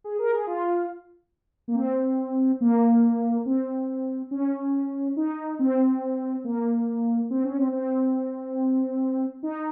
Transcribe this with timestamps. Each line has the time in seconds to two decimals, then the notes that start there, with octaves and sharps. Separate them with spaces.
0.04 G#4
0.19 A#4
0.33 G#4
0.47 F4
1.68 A#3
1.75 C4
2.61 A#3
3.46 C4
4.31 C#4
5.16 D#4
5.59 C4
6.44 A#3
7.30 C4
7.44 C#4
7.58 C4
7.72 C4
9.43 D#4